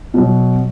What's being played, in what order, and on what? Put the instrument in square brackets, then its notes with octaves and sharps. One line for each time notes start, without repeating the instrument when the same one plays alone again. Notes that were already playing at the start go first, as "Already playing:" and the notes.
[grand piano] B2 F#3